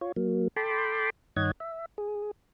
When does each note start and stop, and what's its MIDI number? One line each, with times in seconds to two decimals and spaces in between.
0.01 0.12 65
0.01 0.12 73
0.16 0.48 54
0.16 0.48 58
0.56 1.10 69
0.56 1.10 79
0.56 1.10 81
0.56 1.10 83
0.56 1.10 84
0.56 1.10 86
1.36 1.51 43
1.36 1.51 51
1.36 1.51 73
1.36 1.51 75
1.36 1.51 78
1.36 1.51 92
1.60 1.86 76
1.98 2.31 68